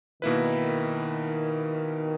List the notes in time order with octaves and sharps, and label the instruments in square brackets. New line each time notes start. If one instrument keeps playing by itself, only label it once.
[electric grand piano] B2 A#3 E4 B4 [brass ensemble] D#3